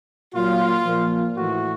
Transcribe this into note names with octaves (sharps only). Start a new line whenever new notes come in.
A#2 F#3 F4
A#2 F3
A2 E3 F#4